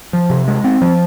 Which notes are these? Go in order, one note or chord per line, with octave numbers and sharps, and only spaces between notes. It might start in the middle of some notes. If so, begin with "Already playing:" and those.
F3
C3
G#3
C4
F3